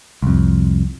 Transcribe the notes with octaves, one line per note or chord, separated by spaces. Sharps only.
C2 F2